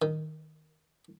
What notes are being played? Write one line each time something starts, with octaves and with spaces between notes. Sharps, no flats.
D#3